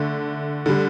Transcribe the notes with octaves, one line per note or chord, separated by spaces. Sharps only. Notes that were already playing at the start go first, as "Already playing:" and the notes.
Already playing: D3 A3
D3 G3